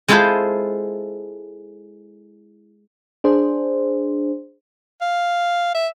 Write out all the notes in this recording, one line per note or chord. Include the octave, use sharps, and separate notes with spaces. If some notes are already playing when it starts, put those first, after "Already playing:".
G#3 E4 F4 G#4 A4 C5
D4 G#4 C5
F5
E5